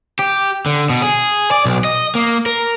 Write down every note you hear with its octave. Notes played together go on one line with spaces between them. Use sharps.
G4
D3
B2
G#4
D5
B1
D#5
A#3
A#4